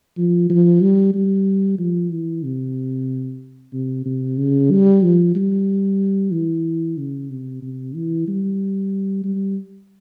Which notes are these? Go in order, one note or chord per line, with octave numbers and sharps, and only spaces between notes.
F3
F3
G3
G3
F3
E3
C3
C3
C3
C#3
G3
F3
G3
E3
C#3
C3
C3
E3
G3
G3